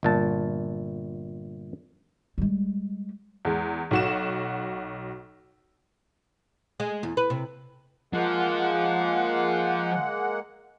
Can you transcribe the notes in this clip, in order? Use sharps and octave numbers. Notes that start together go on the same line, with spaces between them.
G1 A#2 A5
G3 G#3
E2 G#3
B1 F#4 E7
G#3
E2
B4
C3
F3 G#3 A#3 F#5